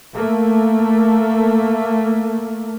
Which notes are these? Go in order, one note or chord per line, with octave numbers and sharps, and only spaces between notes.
A3 A#3